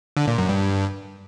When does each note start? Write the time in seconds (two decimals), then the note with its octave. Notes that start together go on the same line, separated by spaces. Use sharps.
0.17 D3
0.27 A#2
0.38 F#2
0.49 G2